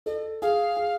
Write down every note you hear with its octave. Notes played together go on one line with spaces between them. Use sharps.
A4 D#5
G#4 F5
G#4